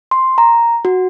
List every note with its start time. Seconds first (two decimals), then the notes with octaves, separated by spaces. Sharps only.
0.11 C6
0.38 A#5
0.85 F#4